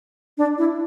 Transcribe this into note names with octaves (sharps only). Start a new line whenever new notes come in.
D4
E4